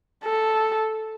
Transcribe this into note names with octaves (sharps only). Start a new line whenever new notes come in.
A4